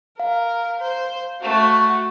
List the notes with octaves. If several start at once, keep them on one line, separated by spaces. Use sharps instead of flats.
A#4 F5
C5
A3 F#4